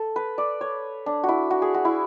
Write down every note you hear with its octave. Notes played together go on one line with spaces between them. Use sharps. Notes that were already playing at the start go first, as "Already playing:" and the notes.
Already playing: A4
B4
D5
C#5
D4
F#4
E4
F#4
G#4
F#4
E4